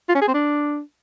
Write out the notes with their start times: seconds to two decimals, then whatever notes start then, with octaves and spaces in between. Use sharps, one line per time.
0.09 F4
0.15 C#4
0.21 G#4
0.28 C4
0.34 D4